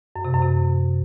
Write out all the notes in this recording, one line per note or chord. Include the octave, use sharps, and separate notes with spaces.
F#2
C3
F#2
C3